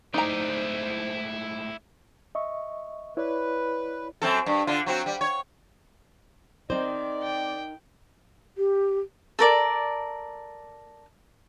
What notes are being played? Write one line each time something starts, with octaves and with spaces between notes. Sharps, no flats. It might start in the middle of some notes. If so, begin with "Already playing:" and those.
A2 G#3 D#4 E4 C5 D5 A#5
D#5 E5 C#6
E4 B4 C#5 D5
F#2 C4 A4
G2
D3 F4
F#3 C4 F#4
G3
C#5
C4 D#4 A#4 C5 D5
G5
G4
A4 A#4 D5